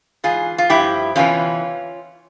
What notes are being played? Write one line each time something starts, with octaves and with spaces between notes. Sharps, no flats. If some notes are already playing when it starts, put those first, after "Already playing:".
G#2 E3 F4 G#4
F4
G2 F3 E4 G4
E2 C3 E3 C#4 F4